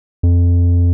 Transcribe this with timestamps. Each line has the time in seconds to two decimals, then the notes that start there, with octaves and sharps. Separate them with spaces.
0.23 F2